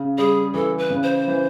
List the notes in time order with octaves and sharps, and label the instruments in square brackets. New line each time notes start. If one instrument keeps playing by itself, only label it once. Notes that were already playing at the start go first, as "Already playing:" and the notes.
Already playing: [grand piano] C#3
[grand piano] G3 [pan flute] G#4
[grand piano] E3 [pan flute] A4
[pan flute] B4
[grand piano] C#3
[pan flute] C5
[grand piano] E3